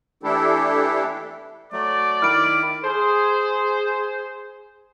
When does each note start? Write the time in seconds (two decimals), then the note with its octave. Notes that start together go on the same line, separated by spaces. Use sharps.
0.23 E3 A3 D4 E4 G4 A4
1.72 F#3 A3 D5
2.22 D#3 E4 F6 D7
2.84 G#4 C5